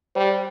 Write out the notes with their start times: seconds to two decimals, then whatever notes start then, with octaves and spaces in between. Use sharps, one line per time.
0.15 G3 C5